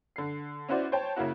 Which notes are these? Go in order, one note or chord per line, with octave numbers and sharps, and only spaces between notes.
D3 C7
C#4 E4 F#4 C5 D5
C5 C#5 G5 A5
C#3 A#3 E4 F#4